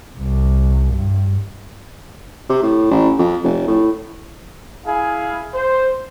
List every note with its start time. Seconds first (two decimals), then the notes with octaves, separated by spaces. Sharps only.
0.19 C2
0.94 G2
2.50 C3
2.63 A2
2.91 A1
3.19 F2
3.44 F1
3.68 A2
4.85 E4 G#4 F5 G#5
5.54 C5